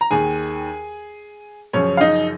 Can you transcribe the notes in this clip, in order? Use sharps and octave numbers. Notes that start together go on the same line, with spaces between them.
A#5
D#2 D#3 G#4 G#5
F#2 C#3 F3 C#4 C#5
F5
D#4 D#5